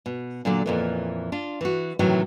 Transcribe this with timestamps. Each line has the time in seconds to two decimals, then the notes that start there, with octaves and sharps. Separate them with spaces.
0.06 B2
0.45 A#2 D3 F#3 D5
0.66 F2 A#2 E3
1.32 D4 F4
1.61 E3 F#4
1.99 A2 C3 D#3 E3 F#3